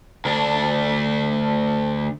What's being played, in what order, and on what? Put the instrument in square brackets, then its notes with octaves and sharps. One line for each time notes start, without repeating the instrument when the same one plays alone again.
[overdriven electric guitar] D2 D4